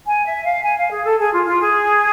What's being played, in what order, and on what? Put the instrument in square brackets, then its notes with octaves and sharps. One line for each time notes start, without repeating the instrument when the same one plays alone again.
[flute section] G#5
E5
F5
G#5
F5
G#4
A4
G#4
F4
F4
G#4